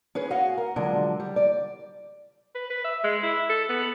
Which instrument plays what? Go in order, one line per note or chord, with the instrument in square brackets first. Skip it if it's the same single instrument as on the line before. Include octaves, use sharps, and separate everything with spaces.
[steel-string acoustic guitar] C#4 G#4 B4
F#4 D#5 F5 F#5 G#5
A#4
D3 F3 F#3 G#3 D4
G3
D5
[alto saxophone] B4
B4
E5
G#3
E4
A4
B3